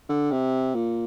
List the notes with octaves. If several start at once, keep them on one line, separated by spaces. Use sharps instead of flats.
D3
C3
A#2